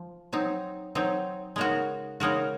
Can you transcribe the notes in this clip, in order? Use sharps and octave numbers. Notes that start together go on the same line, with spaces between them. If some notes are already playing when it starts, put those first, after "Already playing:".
Already playing: F3
F#3 C4 D#4
F#3 C4 D#4
C#3 G#3 D#4 F#4 A#4
C#3 G#3 D#4 F#4 A#4